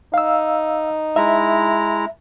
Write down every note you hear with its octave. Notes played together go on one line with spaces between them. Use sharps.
D#4 F5 E6
G#3 E4 E5 A#5